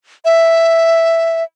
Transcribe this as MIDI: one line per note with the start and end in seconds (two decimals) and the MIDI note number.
0.25 1.43 76